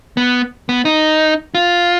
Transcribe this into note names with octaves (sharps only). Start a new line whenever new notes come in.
B3
B3
D#4
F4